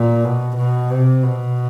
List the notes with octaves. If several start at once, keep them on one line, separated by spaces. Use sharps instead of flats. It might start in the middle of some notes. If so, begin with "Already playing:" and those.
Already playing: A#2
B2
B2
C3
B2